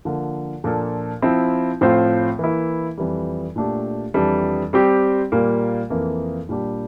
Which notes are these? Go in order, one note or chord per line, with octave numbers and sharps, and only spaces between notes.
D3 F3 A#3
A#2 F3 A#3 D4 A4
F3 C4 E4
A2 F3 C4 F4 C5
E3 A#3 E4
F2 E3 G3
A#2 A3 D4 G4
F2 E3 G3 D4
G3 C4 G4
A#2 G3 A#3
F2 E3 A#3
A#2 G3 D4 G4